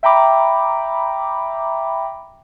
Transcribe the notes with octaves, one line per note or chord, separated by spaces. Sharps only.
E5 G5 A#5 B5 D6